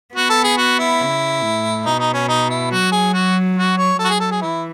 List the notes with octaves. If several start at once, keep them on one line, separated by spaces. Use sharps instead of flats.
B3 F#4
A4
G#4
F#4
E4
C#3
A2
B2 D#4
D#4
C#4
D#4
E4
F#3 F#4
G#4
F#4
F#4
C#5
F#3 A4
F#4
G#4
A4
G#4
E3 E4